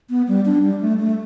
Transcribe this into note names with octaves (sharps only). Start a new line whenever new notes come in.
B3
G3
D4
G3
A3
A3